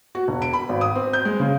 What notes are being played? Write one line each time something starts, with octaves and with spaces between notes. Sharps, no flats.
F#4
E1
D7
B5
G#1
D#6
C4
G6
G#3
C#3